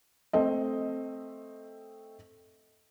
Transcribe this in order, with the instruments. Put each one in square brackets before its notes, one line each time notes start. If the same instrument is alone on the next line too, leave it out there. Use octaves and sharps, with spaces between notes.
[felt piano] A3 C4 D#5